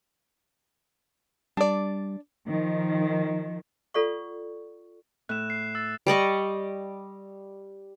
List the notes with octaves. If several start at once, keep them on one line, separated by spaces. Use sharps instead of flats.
G3 D4 D5
D#3 F3
F4 A4 D5 F#5 C#6
A2 F#6 E7
C7
E6 A6
G3 D5 D#5 C#6